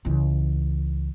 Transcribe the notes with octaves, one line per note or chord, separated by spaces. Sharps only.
C#2 E3